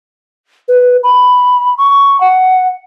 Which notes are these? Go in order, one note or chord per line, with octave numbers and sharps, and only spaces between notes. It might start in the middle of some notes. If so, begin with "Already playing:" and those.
B4
B5
C#6
F#5